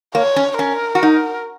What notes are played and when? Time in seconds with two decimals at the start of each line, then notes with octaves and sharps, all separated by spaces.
0.15 A#3 C#5
0.36 C#4
0.59 C#4 A#4
0.95 F#4
1.03 D#4